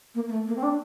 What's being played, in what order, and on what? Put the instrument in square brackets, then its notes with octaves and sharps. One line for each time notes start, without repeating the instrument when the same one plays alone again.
[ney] A#3
A#3
A3
A#3
C4
D4